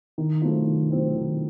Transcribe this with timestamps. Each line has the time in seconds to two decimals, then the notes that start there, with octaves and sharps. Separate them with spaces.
0.18 D#3
0.42 F#3 A3 C4 F4
0.66 D#3
0.91 F#3 A3 C4 F4
1.15 D#3